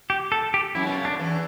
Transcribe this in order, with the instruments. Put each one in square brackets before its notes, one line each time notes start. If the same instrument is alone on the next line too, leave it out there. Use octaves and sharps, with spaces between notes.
[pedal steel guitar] G4
A4
G4
[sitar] F#2 F#3 [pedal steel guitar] E4
[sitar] B2
C#3
[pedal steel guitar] D4
[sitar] D3
E2 E3